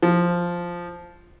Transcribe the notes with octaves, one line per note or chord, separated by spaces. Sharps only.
F3